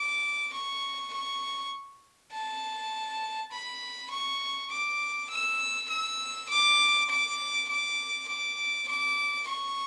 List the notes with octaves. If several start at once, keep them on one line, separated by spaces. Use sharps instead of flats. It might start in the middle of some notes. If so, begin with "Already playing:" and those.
Already playing: D6
C#6
C#6
A5
B5
C#6
D6
E6
E6
D6
D6
D6
D6
D6
C#6